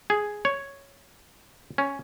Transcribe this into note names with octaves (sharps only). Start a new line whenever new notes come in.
G#4
C#5
C#4